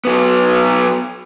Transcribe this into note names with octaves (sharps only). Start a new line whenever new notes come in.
F#3 B3